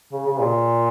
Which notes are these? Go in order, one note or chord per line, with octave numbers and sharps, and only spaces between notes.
C#3
C#3
A#2